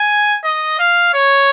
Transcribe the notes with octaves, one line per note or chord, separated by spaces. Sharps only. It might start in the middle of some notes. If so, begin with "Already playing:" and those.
Already playing: G#5
D#5
F5
C#5